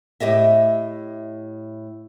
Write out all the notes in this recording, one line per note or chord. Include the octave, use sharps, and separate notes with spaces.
A2 G4 D#5 E5